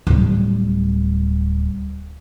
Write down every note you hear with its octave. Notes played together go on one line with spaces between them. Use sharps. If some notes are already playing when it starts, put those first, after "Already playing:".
D1 G3